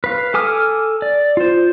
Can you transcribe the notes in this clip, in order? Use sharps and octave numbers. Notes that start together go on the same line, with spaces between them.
B4 F5
A4 G#5 D6 D#6 F6
D5
F4 C5